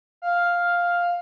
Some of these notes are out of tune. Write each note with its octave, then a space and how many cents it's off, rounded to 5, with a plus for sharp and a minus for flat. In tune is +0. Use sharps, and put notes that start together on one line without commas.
F5 +5